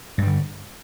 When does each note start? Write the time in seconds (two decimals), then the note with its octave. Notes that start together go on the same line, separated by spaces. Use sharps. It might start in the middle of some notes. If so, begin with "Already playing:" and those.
0.18 G2
0.22 G3
0.27 D3